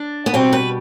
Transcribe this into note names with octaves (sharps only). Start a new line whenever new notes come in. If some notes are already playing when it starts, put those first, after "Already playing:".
Already playing: D4
B3
B2 G3 C4
B4